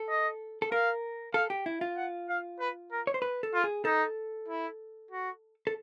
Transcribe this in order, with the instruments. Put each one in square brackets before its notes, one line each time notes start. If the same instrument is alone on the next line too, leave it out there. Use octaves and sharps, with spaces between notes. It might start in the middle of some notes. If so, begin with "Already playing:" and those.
Already playing: [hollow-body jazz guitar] A4
[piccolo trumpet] D#5
[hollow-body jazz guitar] A4
[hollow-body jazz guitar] A#4 [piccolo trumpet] F5
[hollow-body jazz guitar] A4 [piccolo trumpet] F5
[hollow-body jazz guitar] G4
E4
F4
[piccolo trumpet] F#5
F5
B4
A#4
[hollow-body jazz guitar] C#5
C5
B4
A4
[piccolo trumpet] F4
[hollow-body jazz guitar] G#4
[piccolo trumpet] D#4 [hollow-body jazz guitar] A4
[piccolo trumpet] E4
F#4
[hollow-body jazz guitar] A4